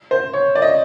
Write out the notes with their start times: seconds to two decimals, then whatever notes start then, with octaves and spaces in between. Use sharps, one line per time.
0.11 C5
0.33 C#5
0.55 D5
0.62 D#5